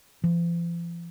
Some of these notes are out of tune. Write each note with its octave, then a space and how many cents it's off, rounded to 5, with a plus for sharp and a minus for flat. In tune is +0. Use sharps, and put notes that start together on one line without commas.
F3 -45